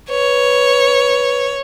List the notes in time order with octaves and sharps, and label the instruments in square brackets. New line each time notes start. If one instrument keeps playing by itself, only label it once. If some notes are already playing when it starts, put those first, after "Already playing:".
[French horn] B4 [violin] C#5